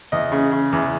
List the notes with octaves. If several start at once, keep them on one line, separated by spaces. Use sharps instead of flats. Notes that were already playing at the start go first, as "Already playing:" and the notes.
E2 D#5
C#3
C#3
E2